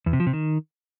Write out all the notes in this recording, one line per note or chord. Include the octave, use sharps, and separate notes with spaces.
E2
C3
F3
C3
D#3